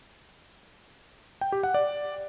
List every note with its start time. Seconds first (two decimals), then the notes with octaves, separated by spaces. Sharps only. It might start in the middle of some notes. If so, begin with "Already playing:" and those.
1.41 G5
1.52 G4
1.63 F#5
1.74 D5